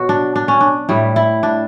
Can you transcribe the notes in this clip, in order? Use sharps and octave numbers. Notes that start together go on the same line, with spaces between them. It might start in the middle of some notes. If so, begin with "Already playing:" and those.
Already playing: B2 F#3 F#4
D4
D4
C#4
D4
A2 G3 E4
E4
D4